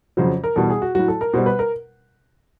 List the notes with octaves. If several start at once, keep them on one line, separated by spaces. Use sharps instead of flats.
F2 C#3 F#3 C5
A#4
E2 B2 G3 A4
G#4
F#4
A2 F#3 F#4
A4
A#4
B2 G3 C5
B4
A#4